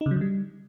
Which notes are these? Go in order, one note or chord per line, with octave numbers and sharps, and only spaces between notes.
D#4
C#3
F#3
D3
G3